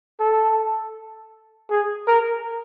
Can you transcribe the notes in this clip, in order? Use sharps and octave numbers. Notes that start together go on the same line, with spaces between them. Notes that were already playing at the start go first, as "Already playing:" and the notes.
A4
G#4
A#4